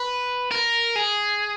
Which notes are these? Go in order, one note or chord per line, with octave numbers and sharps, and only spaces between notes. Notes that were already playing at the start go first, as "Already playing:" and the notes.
Already playing: B4
A#4
G#4